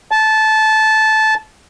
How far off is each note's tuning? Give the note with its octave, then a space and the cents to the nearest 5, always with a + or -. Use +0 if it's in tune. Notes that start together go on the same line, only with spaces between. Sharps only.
A5 -15